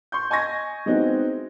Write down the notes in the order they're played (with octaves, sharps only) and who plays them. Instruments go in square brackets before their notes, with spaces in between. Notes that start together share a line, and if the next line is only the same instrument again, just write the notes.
[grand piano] C6 C#6 G6
D#5 G#5 C#6 G#6 A#6
G#3 B3 C4 D#4 E4 F#4